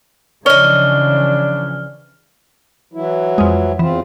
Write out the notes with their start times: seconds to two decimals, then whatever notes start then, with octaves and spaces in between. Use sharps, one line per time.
0.46 C#3 E3 F3 D4 C#5 D#5 F6 G7
2.93 E3 F#3 E4
3.38 F2 G#3
3.79 E2 E3 C4 F4